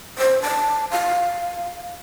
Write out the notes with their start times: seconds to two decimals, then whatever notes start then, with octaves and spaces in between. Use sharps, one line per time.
0.18 C5
0.42 A5
0.91 F5